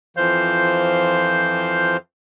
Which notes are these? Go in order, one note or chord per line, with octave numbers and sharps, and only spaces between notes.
F2 E3 F3 C5 F5 G6